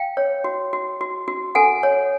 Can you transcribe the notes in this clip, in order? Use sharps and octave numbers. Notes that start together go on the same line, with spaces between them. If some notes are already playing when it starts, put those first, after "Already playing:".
Already playing: F5 G5
C#5
F#4
F#4
F#4
F#4
A4 F#5 G#5
C#5